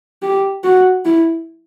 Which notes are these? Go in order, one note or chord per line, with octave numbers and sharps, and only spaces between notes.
G4
F#4
E4